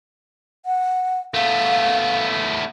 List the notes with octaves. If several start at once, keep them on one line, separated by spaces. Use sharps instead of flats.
F#5
A3 B3 F5